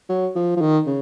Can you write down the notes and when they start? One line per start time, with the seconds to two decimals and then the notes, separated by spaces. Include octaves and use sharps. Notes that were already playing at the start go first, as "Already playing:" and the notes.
0.09 F#3
0.35 F3
0.57 F3
0.61 D#3
0.86 C#3